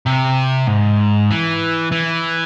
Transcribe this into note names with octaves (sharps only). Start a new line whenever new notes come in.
C3
G#2
E3
E3